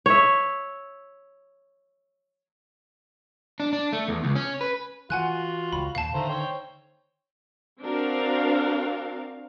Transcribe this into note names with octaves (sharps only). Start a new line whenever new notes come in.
C#5 E5
D4
D4
A3
E2
C#2
C#4
B4
E3 F4 F#4 F#5 G#5 F#6
C#2 B5
D#2 A#2 F5 A5
D3 D#3 A3 C5 A#5
C5 C#5 G5
C4 D4 F#4 A#4 F5